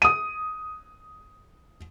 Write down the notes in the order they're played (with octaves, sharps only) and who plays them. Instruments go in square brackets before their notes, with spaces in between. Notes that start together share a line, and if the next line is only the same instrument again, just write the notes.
[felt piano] D#6 D#7